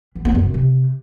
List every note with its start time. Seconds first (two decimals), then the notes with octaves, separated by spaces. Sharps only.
0.15 E3
0.25 B3
0.35 F#2
0.44 B2
0.54 C3